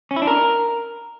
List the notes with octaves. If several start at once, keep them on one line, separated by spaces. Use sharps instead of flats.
C#4
E4
D4
A#4